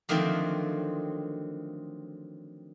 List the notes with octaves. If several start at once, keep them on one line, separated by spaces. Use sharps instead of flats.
D3 D#3 F3 F#3 A3 C4